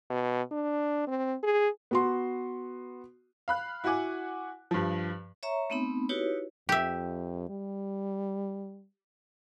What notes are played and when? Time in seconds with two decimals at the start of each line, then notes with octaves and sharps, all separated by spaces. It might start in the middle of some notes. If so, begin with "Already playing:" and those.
0.10 B2
0.52 D4
1.08 C4
1.43 G#4
1.91 B3 F#4 C6
3.48 F5 B5 F#6
3.84 E4 F#4 F#5 G#5 D6
4.71 G2 F3
5.43 C#5 E5 A#5 C#6
5.70 A3 B3 C4 D#4 B5
6.09 D#4 E4 F#4 G4 B4 C#5
6.69 F2 G4 E5
7.49 G3